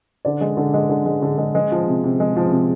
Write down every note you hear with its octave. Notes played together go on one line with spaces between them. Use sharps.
D3 D5
G#3
D3
G#3
D3
G#3
D3
G#3
G#3 G#4
F3
C3
C3
G#3
F3
C3